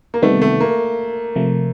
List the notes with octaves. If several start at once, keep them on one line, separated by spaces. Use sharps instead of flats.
A#3
C3 D#3 G3 A3 B3
A3
A#3
C3 F3 A3